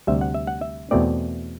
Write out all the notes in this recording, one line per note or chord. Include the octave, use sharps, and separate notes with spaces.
D2 C3 G3 E5
F#5
E5
F#5
E5
E2 B2 A3 C4 D5